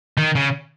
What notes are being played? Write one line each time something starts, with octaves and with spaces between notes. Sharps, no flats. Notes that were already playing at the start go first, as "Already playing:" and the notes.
D#3
C#3